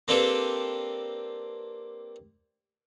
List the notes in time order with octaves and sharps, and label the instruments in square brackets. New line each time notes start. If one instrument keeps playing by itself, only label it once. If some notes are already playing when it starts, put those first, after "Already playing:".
[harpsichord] A#3 C4 D4 G4 A4 B4